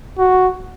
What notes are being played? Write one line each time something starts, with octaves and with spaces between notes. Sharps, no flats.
F#4